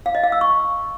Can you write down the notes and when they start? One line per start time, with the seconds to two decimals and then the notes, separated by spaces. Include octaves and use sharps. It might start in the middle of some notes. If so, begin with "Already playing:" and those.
0.06 F5
0.15 D#5
0.23 F5
0.32 E6
0.41 C#6